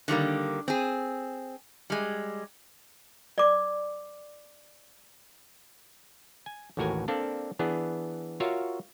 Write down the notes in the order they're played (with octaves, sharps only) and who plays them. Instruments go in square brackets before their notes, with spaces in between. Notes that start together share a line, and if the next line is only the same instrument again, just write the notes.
[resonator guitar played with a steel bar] D3 D#3 G3 A#3
C4 G#4
G3 G#3
[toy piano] D5 D6
[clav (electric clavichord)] G#5
A1 D#2 A2 F#4 A#4 G#5
A#3 C4 D4 A4 D5 F5
E3 B3 D4 G#4
F4 F#4 A#4 C#5 E5 F5